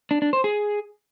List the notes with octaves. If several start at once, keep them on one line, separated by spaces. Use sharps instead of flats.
D4
D4
C5
G#4